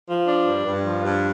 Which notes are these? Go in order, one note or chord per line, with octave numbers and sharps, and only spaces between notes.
F3
D4
G2
G2
F3
G2